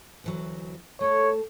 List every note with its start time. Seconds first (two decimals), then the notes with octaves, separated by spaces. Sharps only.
0.24 D2 E3 F#3
1.01 A3 A4 C#5